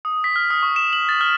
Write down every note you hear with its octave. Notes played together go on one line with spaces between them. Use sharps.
D#6
B6
F6
D#6
C#6
E7
F#7
A6
F6